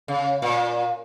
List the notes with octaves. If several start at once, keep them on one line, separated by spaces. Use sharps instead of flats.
C#3
A#2